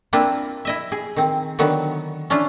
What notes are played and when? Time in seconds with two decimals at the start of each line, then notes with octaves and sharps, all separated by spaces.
0.13 A#3 C4 D4 E4 F4
0.65 E4 D#5 E5
0.92 G#4
1.16 D#3 C4
1.59 D3 D#3 F#3 B3
2.30 C#4 D4 E4 F4